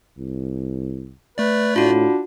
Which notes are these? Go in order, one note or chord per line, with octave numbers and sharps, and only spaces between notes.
C2
A3 B4 D5
A2 D4 F4 F#4